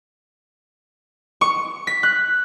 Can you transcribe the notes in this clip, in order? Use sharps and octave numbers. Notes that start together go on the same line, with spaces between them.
C#6
B6
F#6